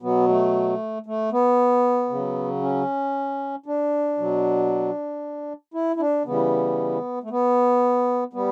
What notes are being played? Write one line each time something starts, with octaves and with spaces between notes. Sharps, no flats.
B2 F#3 B3
A3
A3
B3
C#3 F#3
C#4
D4
B2 F#3
E4
E4
D4
C#3 E3 G3 B3
A3
B3
G3 B3